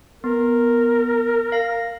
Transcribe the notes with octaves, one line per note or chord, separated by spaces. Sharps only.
B3 A#4
F5 A#6